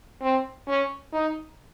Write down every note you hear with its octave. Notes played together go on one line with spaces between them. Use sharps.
C4
C#4
D#4